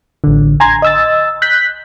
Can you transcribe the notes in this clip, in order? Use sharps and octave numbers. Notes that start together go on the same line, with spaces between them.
A1 D3
G#5 A#5 C6 G#6
D#5 E6 A6
F#6 G6 B6